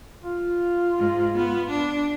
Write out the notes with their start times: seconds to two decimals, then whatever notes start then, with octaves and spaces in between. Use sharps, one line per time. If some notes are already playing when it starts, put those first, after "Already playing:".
0.23 F4
0.98 G#2
1.37 B3
1.69 D4